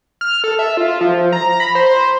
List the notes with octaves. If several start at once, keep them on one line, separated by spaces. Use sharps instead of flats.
F6
A4
E5
F4
F3
A#5
B5
C5